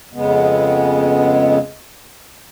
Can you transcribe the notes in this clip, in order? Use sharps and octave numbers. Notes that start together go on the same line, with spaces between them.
F2 C#3 G#3 B3